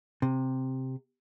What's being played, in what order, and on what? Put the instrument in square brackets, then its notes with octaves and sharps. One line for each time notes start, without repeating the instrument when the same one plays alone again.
[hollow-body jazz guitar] C3